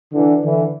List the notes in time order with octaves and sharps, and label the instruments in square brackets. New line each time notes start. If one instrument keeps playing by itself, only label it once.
[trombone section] D3 E3
D3 E3